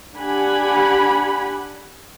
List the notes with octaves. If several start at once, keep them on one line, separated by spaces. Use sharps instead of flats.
D4 G4 F#5 G#5 B5